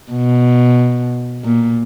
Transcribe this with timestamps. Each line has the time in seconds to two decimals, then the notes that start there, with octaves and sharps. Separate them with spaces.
0.12 B2
1.45 A#2